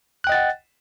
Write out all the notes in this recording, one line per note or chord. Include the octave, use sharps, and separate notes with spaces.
D#5 F#5 G5 F#6 A6